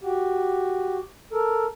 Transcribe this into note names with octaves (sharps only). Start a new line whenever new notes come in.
F#4 G4
A4 A#4